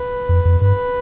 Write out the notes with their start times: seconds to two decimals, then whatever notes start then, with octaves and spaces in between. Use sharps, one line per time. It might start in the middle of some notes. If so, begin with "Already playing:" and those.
Already playing: B4
0.29 F2
0.45 F2
0.61 G2 B4